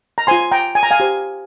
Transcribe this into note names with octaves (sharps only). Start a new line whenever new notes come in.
A#5
F4 C5 G#5 C6
G5 A#5
G#5
A#5
F5 G#5
G4 C5